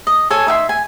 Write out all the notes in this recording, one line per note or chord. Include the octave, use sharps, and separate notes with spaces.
D#5
A4 C#5 G#5
D#4 E5 G5 C6
G#5